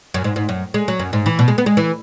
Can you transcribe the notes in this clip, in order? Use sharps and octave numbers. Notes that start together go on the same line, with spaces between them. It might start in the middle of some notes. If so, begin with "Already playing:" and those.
F#2
G#2
G#2
F#2
G#3
F#3
F#2
G#2
E3
B2
G#3
B3
G#3
E3